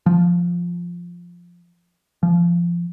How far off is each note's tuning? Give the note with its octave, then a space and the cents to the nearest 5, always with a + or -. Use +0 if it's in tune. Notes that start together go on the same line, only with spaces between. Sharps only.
F3 +0
F3 -20